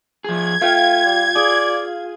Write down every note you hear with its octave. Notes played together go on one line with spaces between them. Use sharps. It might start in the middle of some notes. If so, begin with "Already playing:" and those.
F3 G#4 G#6
A3 F4 F5 G5
G3
G#4 D5